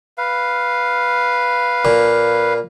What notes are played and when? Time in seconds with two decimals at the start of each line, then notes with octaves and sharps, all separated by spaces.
0.18 B4 F5
1.85 A#2